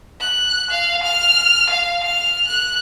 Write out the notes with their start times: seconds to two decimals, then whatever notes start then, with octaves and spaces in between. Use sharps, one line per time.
0.20 F#6
0.70 F5
1.04 F6
1.70 F5
2.04 F6
2.48 F#6